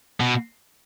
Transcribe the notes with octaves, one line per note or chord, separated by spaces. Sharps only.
B2